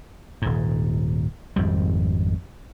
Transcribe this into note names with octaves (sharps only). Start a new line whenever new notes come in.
D#1 G#2
G#1 F2 G3